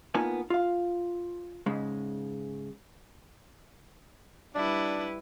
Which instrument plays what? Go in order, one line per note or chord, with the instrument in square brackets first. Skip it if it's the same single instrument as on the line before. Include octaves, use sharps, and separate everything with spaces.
[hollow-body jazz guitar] A#3 B3 D#4 F4 G#5 A5
F4 F5
G#2 C#3 G#3
[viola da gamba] G3 E4 B4 [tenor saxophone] D4